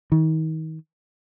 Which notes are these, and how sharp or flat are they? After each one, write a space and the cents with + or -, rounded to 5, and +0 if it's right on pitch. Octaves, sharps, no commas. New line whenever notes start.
D#3 +35